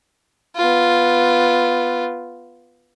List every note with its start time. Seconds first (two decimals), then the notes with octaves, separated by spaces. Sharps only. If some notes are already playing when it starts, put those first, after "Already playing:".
0.56 B3 F4